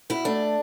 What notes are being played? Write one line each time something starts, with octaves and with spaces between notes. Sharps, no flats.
B2 E4
A3 D4